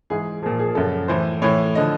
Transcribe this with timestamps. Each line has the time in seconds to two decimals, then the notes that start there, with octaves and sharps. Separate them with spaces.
0.10 G#2 E3 G#4
0.42 A#2 F3 G#4
0.59 G#4
0.75 F#2 C#3 F3 A4
1.08 A2 E3 C5
1.42 A2 E3 C#5
1.75 D3 F3 D#5